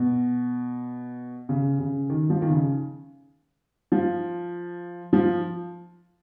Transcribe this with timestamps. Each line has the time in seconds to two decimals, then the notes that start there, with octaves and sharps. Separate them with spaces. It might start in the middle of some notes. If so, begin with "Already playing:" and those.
Already playing: B2
1.49 C#3
1.79 C#3
2.10 D#3
2.30 F3
2.42 D#3
2.50 C#3
3.92 F3
5.13 F3